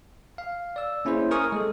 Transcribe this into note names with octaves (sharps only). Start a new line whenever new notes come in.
F5
D5 E6
A#3 C#4 E4 G#4 C5
A#4 G#5 C#6 D#6 F6
G#3 A4